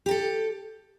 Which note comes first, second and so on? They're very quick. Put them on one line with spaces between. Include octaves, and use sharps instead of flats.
G4 A#4 A4